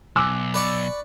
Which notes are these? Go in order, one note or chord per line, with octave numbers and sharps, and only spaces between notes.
B1 G#5 D6 E6 F#6
B4 D5 C#6